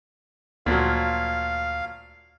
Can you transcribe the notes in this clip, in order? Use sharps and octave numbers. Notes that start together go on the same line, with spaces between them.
D2 A#2 F3 F#3 F5